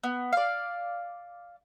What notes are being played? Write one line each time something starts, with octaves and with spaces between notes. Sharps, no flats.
B3
D5 F5